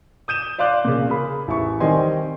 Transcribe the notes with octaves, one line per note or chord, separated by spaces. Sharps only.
D#6 G6 D#7 E7
D5 F5 C6 D6 F#6
A#2 C#3
G#4 A#4 B5
A1 E5 C#6
D#3 G3 C4 D#5 G#5 C6